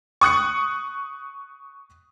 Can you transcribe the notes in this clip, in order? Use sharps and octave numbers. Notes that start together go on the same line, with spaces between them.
C#6 D#6 F#6 C#7